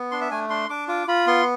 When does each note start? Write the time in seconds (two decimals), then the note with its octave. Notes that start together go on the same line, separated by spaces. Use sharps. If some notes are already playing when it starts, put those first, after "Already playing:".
Already playing: B3
0.11 D4 C6
0.21 E5
0.31 A3 G#5
0.50 D4 C6
0.70 D4 D6
0.88 F4 D6
1.07 F4 B5
1.26 B3 C6